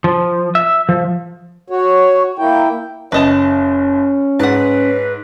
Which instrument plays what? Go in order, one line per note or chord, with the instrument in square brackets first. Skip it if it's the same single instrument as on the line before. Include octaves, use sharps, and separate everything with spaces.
[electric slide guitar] F3
E5
F3
[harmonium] F#4 C#5
A#3 E4 G5
[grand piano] F#1 E7 [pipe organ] C#4 [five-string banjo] B4 D#5 A5
[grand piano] G#2 [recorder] B4 [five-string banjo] F#5 A5